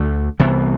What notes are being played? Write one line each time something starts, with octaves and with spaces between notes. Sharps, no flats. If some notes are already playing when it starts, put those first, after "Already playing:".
Already playing: D2 D3 A3
C2 C3 E3 B3